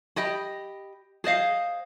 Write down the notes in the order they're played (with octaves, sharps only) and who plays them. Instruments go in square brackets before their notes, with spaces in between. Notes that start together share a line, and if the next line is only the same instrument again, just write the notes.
[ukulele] G4 D#5 B5
G#4 C5 D#5 F5